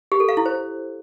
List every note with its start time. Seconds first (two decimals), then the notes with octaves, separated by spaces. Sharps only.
0.12 G4
0.20 A4
0.29 F5
0.37 E4
0.46 C5